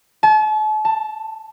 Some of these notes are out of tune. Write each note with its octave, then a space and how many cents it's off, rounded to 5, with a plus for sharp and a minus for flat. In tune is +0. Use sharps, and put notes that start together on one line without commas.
A5 -40
A5 +10